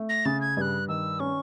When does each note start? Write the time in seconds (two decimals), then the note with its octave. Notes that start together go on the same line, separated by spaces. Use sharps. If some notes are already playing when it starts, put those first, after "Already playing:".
Already playing: A3
0.09 A#6
0.25 C#3 A6
0.41 G#6
0.56 G2 F#6 G#6
0.88 D#3 E6
1.20 C#4 C#6